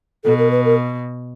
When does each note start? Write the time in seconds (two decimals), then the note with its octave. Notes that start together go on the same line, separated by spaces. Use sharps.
0.24 B2 A4
0.38 A#4
0.51 B4
0.65 A#4